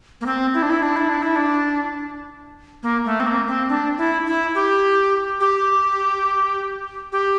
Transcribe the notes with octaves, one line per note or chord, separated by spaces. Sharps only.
A#3
C4
E4
D4
E4
D4
E4
D4
E4
D4
A#3
A3
C4
A#3
C4
D4
E4
E4
G4
G4
G4